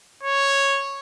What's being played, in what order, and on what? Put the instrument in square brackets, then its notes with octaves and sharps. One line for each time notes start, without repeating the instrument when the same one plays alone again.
[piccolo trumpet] C#5